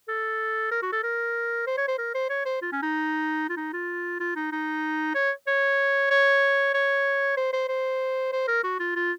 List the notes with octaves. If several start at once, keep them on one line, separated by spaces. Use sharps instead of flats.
A4
A#4
F#4
A4
A#4
C5
C#5
C5
A#4
C5
C#5
C5
F4
C#4
D#4
F4
D#4
F4
F4
D#4
D#4
C#5
C#5
C#5
C#5
C5
C5
C5
C5
A#4
F#4
F4
F4